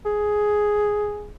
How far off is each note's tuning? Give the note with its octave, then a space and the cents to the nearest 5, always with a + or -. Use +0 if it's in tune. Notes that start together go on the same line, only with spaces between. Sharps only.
G#4 +5